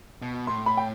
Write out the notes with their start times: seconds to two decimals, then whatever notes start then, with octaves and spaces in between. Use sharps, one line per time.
0.22 B2
0.47 A2 C6
0.66 B5
0.77 G5